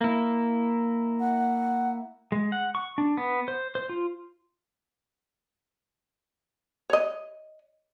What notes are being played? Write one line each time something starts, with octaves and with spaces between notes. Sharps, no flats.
A#3 E4
F#5
G#3
F#5
C#6
D4
B3
C5
C5
F4
C#5 D#5